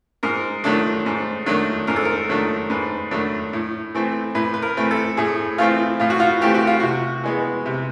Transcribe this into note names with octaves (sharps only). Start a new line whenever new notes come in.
G#2 A#4
D#3 F#3 A3 D4
G#2
D#3 F#3 A3 D4
G#2 A#4
A4
A#4
D#3 F#3 A3 D4
G#2 B4
D#3 F#3 A3 D4
A2
E3 A3 C4
A2 B4
B4
A#4
E3 A3 C4
A4
A2 G#4
E3 A3 C4 F4
A2 F4
F#4
F4
E3 A3 C4 G4
F#4
F4
C3 F#4
E3 G#3 B3
C3